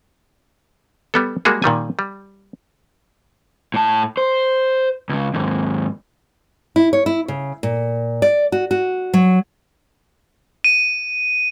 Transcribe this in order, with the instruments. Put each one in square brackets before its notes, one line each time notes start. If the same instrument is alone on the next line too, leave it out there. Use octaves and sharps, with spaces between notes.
[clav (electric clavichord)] G3 B3 A4
G3 G#3 A#3 F#4 G#4
A#2 D#3 G3 G#5
G3
[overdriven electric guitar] A2 A5
C5
C#2 C#3
D#2 G#2
[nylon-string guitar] E4
C#5
E4
C#3
A#2
D5
F#4
F#4
F#3
[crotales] D#7